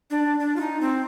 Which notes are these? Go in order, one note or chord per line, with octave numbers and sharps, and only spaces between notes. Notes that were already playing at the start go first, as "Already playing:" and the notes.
D4
D4
F4
D#4
C4